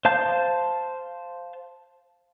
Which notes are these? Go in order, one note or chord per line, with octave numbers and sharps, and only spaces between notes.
C5 F5 A5 G6